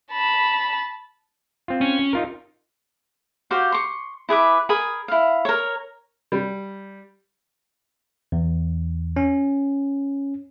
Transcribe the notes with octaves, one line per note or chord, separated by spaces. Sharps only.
A5 B5
C4 F4
C#4
D#4 F4 A#4
F#4 G4 C5 F5
C6 C#6
E4 G#4 B4 D6
G#4 A#4 B5 D#6
E4 F5
A#4 C#5
G3
E2
C#4